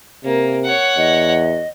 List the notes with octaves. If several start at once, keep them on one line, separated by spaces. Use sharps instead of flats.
C3 A#3
C#5 F#5
E2 D#5